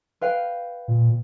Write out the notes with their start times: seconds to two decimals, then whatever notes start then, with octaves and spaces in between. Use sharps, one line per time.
0.21 B4 F5 G5
0.88 A#2